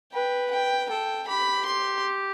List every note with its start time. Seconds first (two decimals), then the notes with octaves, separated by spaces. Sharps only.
0.13 B4 G5
0.52 G5
0.90 A4 G5
1.28 G4 B5
1.66 C6